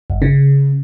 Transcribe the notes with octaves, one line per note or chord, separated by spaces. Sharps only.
G1
C#3